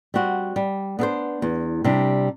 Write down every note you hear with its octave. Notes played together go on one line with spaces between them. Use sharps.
G3 C4 F#4
G3
B3 D4 A4 C5
E2
C3 G3 D4